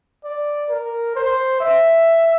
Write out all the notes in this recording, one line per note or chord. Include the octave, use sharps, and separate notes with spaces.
D5
A#4
C5
E5